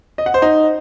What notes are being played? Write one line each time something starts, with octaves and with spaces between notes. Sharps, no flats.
D#5
F#5
C5
D#4